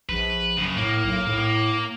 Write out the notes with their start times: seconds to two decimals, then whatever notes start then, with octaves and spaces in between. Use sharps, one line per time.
0.09 A#1 B4
0.57 F#2 C#3
0.77 A2 A#3
1.04 B1
1.27 A2